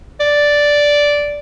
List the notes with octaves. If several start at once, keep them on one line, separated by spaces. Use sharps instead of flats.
D5